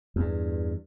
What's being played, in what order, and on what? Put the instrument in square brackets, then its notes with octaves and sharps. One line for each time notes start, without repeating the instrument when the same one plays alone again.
[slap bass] E2 G2